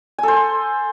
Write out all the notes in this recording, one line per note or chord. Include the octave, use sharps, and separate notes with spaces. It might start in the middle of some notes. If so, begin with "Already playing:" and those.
A4 C5 G#5